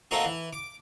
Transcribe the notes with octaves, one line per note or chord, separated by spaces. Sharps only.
A3 A#3 C4 D#4 F#4
E3
D6